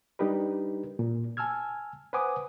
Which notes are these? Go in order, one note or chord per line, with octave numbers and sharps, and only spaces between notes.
G3 D4 D#4 G4 A#4 B4
A#2
G#5 A5 E6 F6 G#6
B4 C5 F#5 G#5 D6 D#6